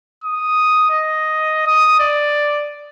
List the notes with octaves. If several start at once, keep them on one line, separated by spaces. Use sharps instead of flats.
D#6
D#5
D#6
D5